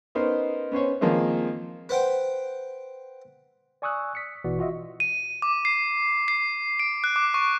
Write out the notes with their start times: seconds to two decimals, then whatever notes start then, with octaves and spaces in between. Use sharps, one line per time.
0.15 B3 C#4 D#4 A#4 C5
0.72 B3 C#4 C5 C#5
1.01 D#3 F3 G#3 A#3 C4 D#4
1.89 B4 C5 F#5 G5
3.82 D5 G#5 C#6 D#6 E6 F#6
4.15 B6 C#7
4.44 A1 B2 E3 F#4 D5
4.59 F4 F#4 D#5 E5
5.00 D#7
5.42 D6
5.65 C7
6.28 C7
6.79 D7
7.04 F#6
7.16 D6
7.34 C#6